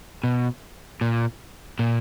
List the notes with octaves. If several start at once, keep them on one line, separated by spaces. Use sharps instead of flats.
B2
A#2
A#2